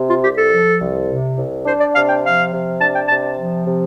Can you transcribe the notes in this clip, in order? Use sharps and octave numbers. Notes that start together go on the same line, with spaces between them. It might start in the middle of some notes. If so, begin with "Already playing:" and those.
Already playing: C3
F4
C2 G4
A4
F3
C2
C3
C2
D4 C5
D5
C3 F5
G5
F3 F5
C3
D4 A5
G5
C3 A5
F3
C3